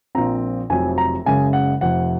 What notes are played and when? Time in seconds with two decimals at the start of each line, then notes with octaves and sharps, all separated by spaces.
0.15 A#1 A#2 F3 C4 A#5
0.70 F1 F2 C3 F#3 C4 G#5
0.98 A#5
1.25 F#1 F#2 C#3 G#3 G#5
1.53 F#5
1.81 F1 F2 C3 F#5